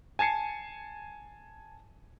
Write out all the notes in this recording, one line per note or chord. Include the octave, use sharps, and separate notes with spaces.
G#5 A5 G#6 C7 C#7